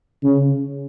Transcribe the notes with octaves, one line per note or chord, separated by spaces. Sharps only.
C#3